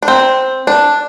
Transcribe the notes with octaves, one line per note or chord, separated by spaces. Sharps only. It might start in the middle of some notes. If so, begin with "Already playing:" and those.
D4
C4
D4